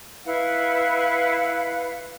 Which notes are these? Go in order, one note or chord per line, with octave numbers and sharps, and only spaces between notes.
E4 B4 F5 F#5